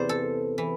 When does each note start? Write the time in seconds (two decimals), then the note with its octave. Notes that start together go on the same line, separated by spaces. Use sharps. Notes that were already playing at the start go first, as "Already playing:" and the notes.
Already playing: E2 C3 E3 C5 D5
0.09 A4
0.58 E3